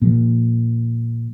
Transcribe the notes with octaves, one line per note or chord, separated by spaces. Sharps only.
A#2 F3